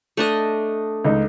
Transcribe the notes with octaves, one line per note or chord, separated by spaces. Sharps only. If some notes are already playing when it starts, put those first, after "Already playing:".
A3 D4 D#5
C#2 D#4